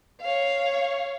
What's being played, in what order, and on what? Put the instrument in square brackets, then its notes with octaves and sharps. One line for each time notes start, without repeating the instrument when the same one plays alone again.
[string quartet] C#5 F5